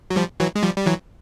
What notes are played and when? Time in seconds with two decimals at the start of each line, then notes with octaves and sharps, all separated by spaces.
0.10 F#3
0.16 F3 G3
0.40 E3 F#3
0.56 G#3
0.63 F3 G3
0.77 G3
0.86 E3 F#3